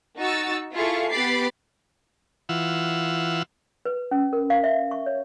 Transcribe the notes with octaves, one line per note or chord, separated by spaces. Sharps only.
D#4 F#4 C#6 E6 A6
E4 F4 G#4 A4 F5 C#6
B3 G4 B5 D6 A6 C7
E3 F4 F#5 E6
B4
C#4
A#4
F5
E5
C#6
C#5